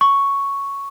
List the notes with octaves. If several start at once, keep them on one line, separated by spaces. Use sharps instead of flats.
C#6